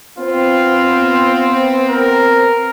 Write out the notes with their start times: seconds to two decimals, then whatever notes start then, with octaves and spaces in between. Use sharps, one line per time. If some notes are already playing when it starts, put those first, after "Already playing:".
0.18 B3 C4 F4
1.89 A#4